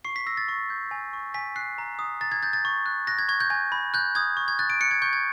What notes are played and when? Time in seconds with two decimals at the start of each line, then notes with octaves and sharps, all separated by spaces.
0.05 C#6 C7
0.16 B6
0.26 E6 A#6
0.37 A6
0.48 C#6
0.70 G6
0.91 G#5
1.13 C#6
1.34 G#5 B6
1.56 F#6 C7
1.78 A#5
1.99 D#6
2.21 A#5 A6
2.32 G#6
2.43 G6 A6
2.53 A6
2.65 C#6
2.86 F#6
3.07 F#6 A#6
3.19 G#6
3.29 C#6 G#6
3.40 G6
3.50 G#5 G#6
3.72 B5
3.94 F#6 G6
4.15 D#6 G#6
4.37 C#6
4.48 G#6
4.59 F#6 A6
4.70 D7
4.81 F#6 C#7
4.91 G#6
5.02 C#6 G6
5.13 G#6